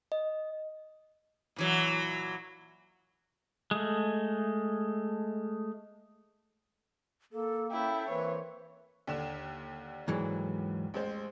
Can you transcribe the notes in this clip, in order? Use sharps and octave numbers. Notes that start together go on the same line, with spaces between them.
D#5
A#2 E3 F#3
G#3 A3
A#3 A4
C#4 E4 A4 E5 G5
E3 A#3 C4 B4 C#5
D#2 D3 E7
G#2 E3 F#3
A1 G#3 C5